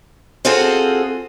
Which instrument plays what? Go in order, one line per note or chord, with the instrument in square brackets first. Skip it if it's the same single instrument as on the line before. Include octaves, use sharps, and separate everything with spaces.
[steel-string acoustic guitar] C4 F4 F#4 G#4 A4 C5